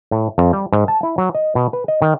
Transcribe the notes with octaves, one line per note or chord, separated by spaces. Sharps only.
A2
F2
G3
G#2
A5
E4
F#3
D#5
B2
B4
D#5
D#3